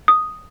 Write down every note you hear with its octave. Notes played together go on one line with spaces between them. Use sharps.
D#6